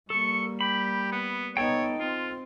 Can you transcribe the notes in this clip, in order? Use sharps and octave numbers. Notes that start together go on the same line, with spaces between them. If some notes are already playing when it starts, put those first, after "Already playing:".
G3 A#3 A4 C#6
G4 B5
B3
B3 D#4 A4 C#5 G5
C4 F4